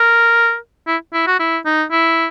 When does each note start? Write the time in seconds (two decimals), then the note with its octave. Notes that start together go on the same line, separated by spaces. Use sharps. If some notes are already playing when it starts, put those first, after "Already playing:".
Already playing: A#4
0.87 E4
1.14 E4
1.27 F#4
1.40 E4
1.66 D#4
1.91 E4